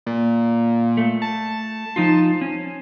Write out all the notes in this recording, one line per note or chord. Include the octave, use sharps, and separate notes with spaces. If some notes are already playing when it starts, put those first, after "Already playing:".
A#2
A3
A5
F3 D#4 F4
C#4